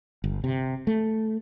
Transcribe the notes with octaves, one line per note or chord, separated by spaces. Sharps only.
G1
C3
A3